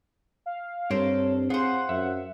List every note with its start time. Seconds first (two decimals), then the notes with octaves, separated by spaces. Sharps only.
0.46 F5
0.91 G2 C4 A4 A#4 C5 C#5
1.50 F4 G#4 C5 F#5
1.89 F#2 E5